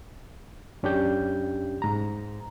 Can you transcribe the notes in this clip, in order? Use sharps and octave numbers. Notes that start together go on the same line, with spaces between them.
F#2 C#4 D4 G4 G6
G#2 A#5